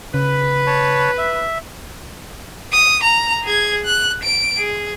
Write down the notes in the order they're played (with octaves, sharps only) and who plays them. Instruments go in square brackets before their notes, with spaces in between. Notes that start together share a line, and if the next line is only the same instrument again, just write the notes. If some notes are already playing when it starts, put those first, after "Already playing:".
[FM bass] C#3 [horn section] B4
[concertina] C#5 A5
E5
[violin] D#6
A#5
G#4 G#6
F#6
D7
G#4